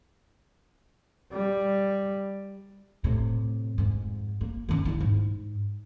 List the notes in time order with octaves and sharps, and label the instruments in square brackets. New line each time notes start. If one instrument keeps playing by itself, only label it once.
[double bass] G3
[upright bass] A2 C3
F2 G#2
A#3
D#3 C#4
G2 E4
G#2